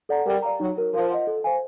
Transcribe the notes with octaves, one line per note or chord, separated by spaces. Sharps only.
A4 D5 F#5 A#5
G3 A#4
D5 F5 A#5
F#3 D#4
F#4 A#4 C#5
F3 A#4
D#5 F#5
A4
C5 F5 G#5